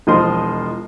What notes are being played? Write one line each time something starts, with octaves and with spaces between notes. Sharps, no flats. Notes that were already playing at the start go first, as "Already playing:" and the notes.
E1 F3 D#5 C6